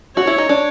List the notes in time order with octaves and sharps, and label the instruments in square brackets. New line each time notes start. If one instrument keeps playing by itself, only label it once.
[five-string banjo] F#4 [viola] C#5
[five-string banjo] E4
D#4
D4